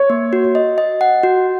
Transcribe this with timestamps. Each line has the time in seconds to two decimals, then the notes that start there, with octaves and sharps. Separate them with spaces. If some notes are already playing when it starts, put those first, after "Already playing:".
Already playing: C#5
0.10 A#3
0.33 F#4
0.55 D#5
0.78 D#5
1.01 F#5
1.23 F#4